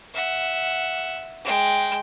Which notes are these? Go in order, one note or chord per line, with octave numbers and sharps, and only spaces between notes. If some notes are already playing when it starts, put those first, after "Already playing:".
E5 F#5
G#3 G5